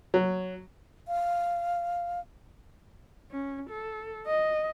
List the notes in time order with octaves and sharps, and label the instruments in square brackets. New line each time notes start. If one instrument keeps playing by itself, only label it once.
[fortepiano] F#3
[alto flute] F5
[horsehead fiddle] C#4
A4
D#5